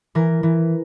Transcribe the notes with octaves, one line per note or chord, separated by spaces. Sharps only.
E3 A#4
E3